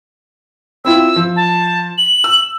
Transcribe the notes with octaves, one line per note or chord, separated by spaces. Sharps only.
C4 E4 F4 E6
F3
A5
F#7
E6